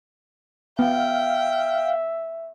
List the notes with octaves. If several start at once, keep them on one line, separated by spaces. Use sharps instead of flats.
B3 E5 F5 G5